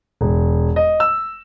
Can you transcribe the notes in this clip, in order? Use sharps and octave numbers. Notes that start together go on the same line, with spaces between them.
E1
D#5
E6